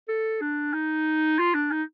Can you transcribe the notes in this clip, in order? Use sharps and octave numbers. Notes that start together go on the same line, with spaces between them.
A4
D4
D#4
F4
D4
D#4